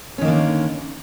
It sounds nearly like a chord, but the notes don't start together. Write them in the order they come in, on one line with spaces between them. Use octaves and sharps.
C#4 D#3 A#3 D3